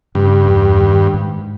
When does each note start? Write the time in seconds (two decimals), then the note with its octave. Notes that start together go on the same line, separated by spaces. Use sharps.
0.15 G2 C#3
0.48 E2
0.81 D#3
1.14 G#2